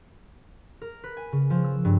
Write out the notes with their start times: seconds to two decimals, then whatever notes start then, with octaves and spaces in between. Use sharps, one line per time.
0.81 A#4
1.04 B4
1.17 G#5
1.32 C#3
1.50 F3
1.64 E6
1.85 G2